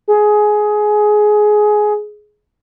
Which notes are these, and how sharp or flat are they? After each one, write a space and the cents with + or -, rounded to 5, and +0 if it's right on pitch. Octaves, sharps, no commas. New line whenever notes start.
G#4 +15